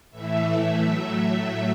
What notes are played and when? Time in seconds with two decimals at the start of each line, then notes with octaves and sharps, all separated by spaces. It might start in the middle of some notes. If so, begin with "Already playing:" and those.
0.11 A2 E3 A3 E5
0.79 A2 F#3 A3